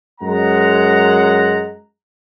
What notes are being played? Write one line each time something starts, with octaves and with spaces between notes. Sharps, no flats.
F#2 G#3 F#5 A#5